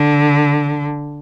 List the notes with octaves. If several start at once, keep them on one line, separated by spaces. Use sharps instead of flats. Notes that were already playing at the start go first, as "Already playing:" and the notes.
Already playing: D3